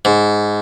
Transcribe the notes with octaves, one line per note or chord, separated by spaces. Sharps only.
G#2